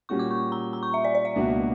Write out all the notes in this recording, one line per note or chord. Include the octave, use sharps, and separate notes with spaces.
A#2 G3 C#4 F#4 C#6
D6
C#6
A#5
A#5
C#6
E5
D5
D5
E5
C#2 B2 A#3 D4 F#4